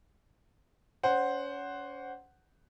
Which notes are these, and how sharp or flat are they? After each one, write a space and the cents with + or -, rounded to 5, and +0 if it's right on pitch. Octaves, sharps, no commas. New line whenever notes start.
C#4 +30 C5 +0 F#5 +5